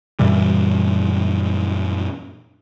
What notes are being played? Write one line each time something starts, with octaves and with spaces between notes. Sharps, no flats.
F#2 A#2 E3 G3